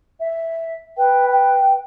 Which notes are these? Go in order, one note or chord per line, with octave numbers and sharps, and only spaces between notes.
E5
B4 G5
G5